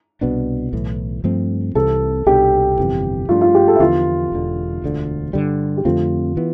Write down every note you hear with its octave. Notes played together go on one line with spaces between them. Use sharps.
C2 B2 B3 D4
B1 A2 E3
G2 F3 A3 C4
C2 C3 E3 A4
C2 B2 B3 D4 G4
G1 F2 C3 E3
G2 F3 A3 D4 F4
F4
G4
A4
E4
E2 D3 F3 B3 F4
E1 E2 D3
E1 D2 D3
G2 D3 G3
G4
F2 D3 A3 C4 F4
E3 B3